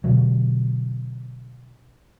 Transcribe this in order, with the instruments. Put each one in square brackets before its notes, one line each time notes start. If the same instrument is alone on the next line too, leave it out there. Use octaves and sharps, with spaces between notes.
[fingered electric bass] B2 D3 F#3